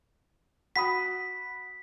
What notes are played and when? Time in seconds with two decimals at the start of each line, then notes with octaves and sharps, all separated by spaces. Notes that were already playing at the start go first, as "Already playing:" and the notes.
0.76 F#4 B5 D#6 B6